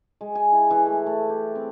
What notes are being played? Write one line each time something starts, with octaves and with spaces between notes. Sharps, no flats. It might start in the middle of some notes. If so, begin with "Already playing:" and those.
G#3
G#5
E4
E3
A3
A3
G4
C4